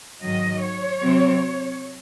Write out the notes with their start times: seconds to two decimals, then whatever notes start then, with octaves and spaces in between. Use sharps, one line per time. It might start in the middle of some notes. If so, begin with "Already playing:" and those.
0.22 G#2 D#3 F#3 D#5
0.62 C#5
1.01 C3 F#3 C4